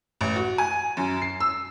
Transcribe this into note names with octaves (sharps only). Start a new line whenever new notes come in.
A1
F#4
G#5
F#2
C7
E6